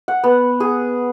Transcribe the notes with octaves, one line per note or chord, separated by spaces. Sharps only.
F#5
B3
G#4